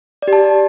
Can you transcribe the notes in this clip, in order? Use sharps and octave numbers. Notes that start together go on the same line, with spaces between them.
D5
G4
A5